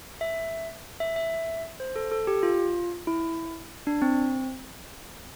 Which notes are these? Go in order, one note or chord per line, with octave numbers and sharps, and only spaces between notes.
E5
E5
E5
C5
A4
A4
G4
F4
E4
D4
C4